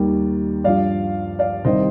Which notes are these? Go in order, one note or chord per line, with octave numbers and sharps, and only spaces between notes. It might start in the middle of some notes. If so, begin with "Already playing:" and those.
Already playing: D#2 D#3 G3
G2 F3 D5 F5
D5 F5
C2 C3 D#3 G3 C5 D#5